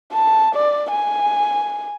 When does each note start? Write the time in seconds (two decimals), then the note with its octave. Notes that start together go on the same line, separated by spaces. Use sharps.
0.13 A5
0.56 D5
0.92 G#5